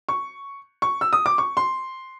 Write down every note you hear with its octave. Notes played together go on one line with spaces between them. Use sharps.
C#6
C#6
E6
D#6
D6
C#6
C6